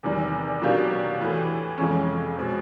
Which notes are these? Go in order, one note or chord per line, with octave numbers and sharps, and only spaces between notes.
E2 C3 D#3 G3
B2 F#3 A#3 D4 G4
A2 E3 A3
F2 C3 F3 G#3 C#4
B2 G#3 C4